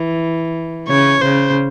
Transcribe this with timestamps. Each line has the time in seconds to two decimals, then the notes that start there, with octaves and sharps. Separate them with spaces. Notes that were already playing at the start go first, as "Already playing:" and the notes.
Already playing: E3
0.88 C#3 C#5
1.22 C#3 C5